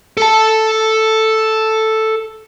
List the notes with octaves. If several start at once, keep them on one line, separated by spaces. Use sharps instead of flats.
A4 A5